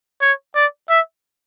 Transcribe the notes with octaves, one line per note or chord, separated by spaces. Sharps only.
C#5
D5
E5